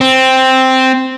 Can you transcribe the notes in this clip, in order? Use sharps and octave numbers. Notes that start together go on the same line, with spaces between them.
C4